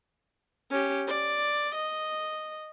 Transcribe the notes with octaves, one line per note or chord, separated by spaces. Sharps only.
C#4 G4
D5
D#5